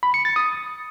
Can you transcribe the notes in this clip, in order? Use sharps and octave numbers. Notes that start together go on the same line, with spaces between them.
B5
C#7
A6
D#6